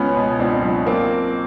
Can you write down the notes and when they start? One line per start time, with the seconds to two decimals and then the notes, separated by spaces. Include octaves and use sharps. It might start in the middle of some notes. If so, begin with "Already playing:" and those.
Already playing: C#2 B3 C#4
0.16 B2
0.39 C#2 C4 D4
0.62 F#3
0.86 F#3 A#3 C4